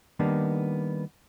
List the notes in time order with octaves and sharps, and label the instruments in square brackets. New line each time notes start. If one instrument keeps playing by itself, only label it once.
[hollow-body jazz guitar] D#3 G3 A#3 B3 D4 D#4